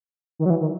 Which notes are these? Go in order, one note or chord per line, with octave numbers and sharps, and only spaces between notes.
D#3
F#3
E3
D#3